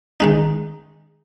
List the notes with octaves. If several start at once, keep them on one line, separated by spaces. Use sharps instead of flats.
D#3 G#3 D#4